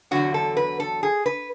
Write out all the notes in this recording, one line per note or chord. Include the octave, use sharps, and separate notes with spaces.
E2 D3 F#3 F#4
A4
B4
A4
G#4
B4